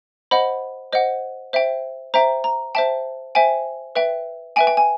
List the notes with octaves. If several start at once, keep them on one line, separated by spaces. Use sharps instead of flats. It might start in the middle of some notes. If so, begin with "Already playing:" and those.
C5 D#5 F#5 B5
C5 D#5 F#5
C5 E5 G5
C5 E5 G5 A#5
A#5
C5 E5 G5 A5
C5 E5 G5 G#5
B4 E5 G5
B4 E5 G5 G#5
G5
G#5